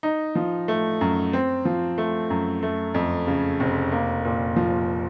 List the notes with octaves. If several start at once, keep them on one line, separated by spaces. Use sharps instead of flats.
D#4
F3
A3
F#2
C4
F3
A3
F#2
A3
F2
C#3
F1
A#3
A#2
F3